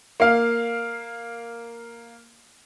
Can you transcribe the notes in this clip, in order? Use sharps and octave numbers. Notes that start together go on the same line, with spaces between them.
A#3 F5